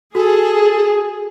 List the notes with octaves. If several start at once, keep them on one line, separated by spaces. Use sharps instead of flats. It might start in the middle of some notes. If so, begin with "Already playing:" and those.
F#4 G#4 A4